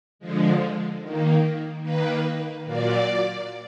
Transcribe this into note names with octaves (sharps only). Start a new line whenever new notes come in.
D3 F3 G#3
D#3 A#3
D#3 A#3 B4
A#2 F#3 A#3 D5